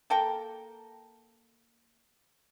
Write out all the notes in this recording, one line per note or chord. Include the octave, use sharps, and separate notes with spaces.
A#3 A4 A#4 G5